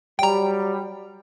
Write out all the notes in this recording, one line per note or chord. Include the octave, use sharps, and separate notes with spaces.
F#3 G3 G5 A#5